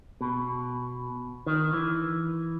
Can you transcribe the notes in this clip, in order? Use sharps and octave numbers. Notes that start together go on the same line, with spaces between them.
B2
D#3
E3